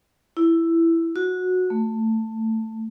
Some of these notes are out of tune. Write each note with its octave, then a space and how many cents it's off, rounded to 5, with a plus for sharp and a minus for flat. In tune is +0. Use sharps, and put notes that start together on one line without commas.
E4 +10
F#4 -15
A3 +15